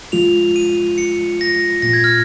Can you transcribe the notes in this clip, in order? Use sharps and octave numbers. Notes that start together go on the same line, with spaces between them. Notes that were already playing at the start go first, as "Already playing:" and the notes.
F3 G#3 F4 F7
D#7
C#7
A#6
A#2 A#3 F4 A#6
G#6
F6